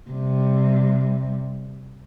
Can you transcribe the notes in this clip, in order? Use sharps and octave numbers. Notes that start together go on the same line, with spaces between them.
C3 G3